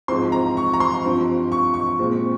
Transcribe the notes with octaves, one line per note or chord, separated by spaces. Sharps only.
G#2 F3 C4 C6
A#5
C#6
A#5
C6
G2 F3 C4
C#6
C#6
A#2 G#3 C4